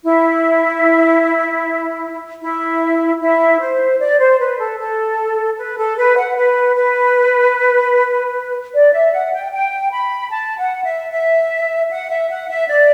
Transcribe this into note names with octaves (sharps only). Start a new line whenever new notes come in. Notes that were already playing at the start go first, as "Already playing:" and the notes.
E4
E4
E4
C5
D5
C5
B4
A4
A4
B4
A4
B4
F#5
B4
B4
D5
E5
F#5
G5
G5
B5
A5
F#5
E5
E5
F#5
E5
F#5
E5
D5